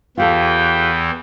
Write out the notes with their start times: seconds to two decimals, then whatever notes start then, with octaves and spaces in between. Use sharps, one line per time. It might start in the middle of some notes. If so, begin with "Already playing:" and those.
0.17 E2 E3 F4 G4 A4 G5